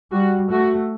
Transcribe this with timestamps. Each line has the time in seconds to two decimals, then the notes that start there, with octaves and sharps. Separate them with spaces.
0.12 G3 F#4
0.50 A3 F#4